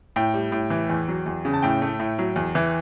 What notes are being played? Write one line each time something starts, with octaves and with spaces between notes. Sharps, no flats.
A2 G5
G3
A2
E3
E2
F#3
E2
C#3
A5
A2 G5
A3
A2
F#3
E2
E3